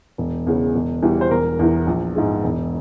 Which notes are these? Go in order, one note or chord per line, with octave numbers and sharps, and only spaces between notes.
E1
E2 C#3
E1
E2 E3 G3
C5
E1 A#4
E2 E3
A#1
G#2 E3 G#3
E1